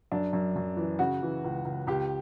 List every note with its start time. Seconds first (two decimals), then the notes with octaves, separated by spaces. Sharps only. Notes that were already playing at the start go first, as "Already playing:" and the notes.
0.12 F#2 D4
0.33 F#2
0.56 F#2
0.77 E3
0.99 C#3 F#4
1.22 E3
1.44 C#2
1.65 C#2
1.87 C#2 G4